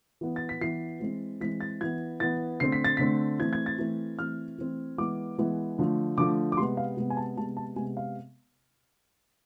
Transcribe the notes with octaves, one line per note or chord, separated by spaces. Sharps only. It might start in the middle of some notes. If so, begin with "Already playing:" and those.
E3 B3
A6
B6
E3 B3 C7
E3 G#3 C4
E3 G#3 C4 B6
A6
E3 B3 G#6
E3 B3 A6
D3 A3 C4 C7
B6
A6
D3 A3 C4 B6
E3 A3 C4 G#6
G#6
A6
E3 A3 C4
E3 A3 C4 F6
E3 A3 C4
E3 G#3 B3 D6
E3 G#3 B3
D3 F3 A3
D3 F3 A3 D6
D6
C3 G#3 B3 C6
F5
C3 G#3 B3
G#5
A5
C3 G#3 B3 A5
A5
C3 G#3 B3 G#5
F5